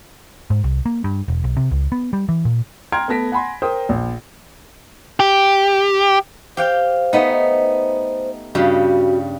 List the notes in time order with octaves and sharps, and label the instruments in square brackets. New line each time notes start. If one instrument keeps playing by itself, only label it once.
[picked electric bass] G#2
C2
A#3
G2
E1
B1
C3
C#2
B3
G3
E3
A#2
[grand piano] G5 A#5 C6 F6 G#6 D7
A3 B3 A5 A#6 B6 D7
F#5 G#5 B5 C6
A#4 C5 G5 D#6
A#1
[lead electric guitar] G4
[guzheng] G4 F5 G5 [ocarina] C5
[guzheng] A3 B3 D#4
[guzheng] G2 C#3 G3 [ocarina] F#4